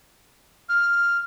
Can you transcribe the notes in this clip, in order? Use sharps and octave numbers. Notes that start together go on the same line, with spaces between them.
F6